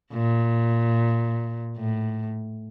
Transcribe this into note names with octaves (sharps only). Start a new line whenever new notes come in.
A#2
A2